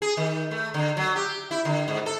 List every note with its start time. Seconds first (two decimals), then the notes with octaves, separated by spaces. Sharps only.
0.02 G#4
0.17 D#3
0.51 A3
0.74 D3
0.97 F#3
1.16 G4
1.51 E4
1.65 D3
1.88 G#2
2.06 A4